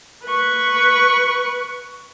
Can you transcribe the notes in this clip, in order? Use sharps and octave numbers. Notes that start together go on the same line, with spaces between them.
B4 C#6